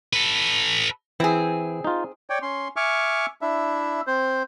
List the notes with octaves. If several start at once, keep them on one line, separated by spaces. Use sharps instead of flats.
A4 B4
E3 C4 E4 G#4
D#4 F4
C#5 D5 G5
C#4 C6
E5 G#5 C#6 D6 F6
D4 E4 E5
C4 C5